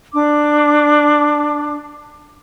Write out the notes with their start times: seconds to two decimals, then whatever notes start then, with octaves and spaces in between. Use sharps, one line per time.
0.13 D4 D6